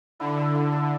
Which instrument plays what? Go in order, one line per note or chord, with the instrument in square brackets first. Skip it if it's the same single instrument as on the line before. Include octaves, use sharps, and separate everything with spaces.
[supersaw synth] D3 [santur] E4
[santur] A4 E5
E4
A4 E5